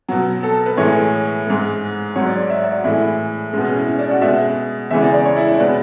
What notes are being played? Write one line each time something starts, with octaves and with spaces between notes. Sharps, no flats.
B2 F#3
A4
A4
B4
A2 E3 G#3 C#5
G#2 G#3
G#2 F#3 C#5
D5
D5
E5
D5
F#4
A2 E3 G#3 E4
B2 G#3 C#4
C#4
E4
C#4
D4
F#4
B2 G#3 E5
E2 C#3 E3 G#3 E5
D5
D5
C#5
E4
D4
B2 G#3 B4